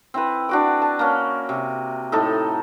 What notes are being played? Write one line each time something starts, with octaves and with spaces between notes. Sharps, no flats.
C4 E4 B4
D4 F#4 D6
A5
A#3 C#4
C3
A2 D#4 A4